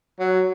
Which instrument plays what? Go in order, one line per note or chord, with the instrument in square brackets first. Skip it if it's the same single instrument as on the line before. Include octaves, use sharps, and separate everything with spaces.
[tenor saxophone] F#3